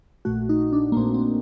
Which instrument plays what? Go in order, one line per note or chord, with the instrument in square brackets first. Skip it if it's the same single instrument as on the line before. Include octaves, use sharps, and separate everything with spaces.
[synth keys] A#1 A#2 A3 F#4
D#4
D4
A#3
A#1 A#2 A3 C4
C4